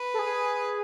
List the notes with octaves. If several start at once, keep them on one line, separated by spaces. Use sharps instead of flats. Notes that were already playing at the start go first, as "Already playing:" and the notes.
Already playing: B4
A4
G#4